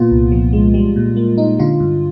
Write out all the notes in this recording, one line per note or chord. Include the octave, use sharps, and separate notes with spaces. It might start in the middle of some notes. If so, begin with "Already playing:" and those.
Already playing: A#2 B3 F4
C2
F3
G#3
G3
A#2
A#3
D#4
D3 F4
G2